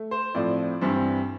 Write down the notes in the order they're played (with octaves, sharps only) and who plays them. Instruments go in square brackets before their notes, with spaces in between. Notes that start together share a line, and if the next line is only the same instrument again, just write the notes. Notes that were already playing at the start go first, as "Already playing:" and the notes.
Already playing: [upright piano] A3
C5
A2 F3 C4 D5
G2 E3 G3 C4